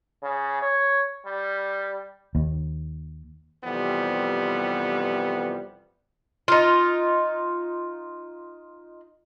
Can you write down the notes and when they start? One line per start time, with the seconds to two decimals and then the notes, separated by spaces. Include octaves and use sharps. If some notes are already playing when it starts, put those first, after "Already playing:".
0.23 C#3
0.62 C#5
1.26 G3
2.35 D#2
3.64 F2 C3 E3 G3 B3
6.48 D#4 F4